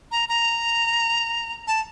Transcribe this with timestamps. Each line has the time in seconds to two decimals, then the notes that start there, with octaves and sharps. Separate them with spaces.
0.11 A#5
0.29 A#5
1.67 A5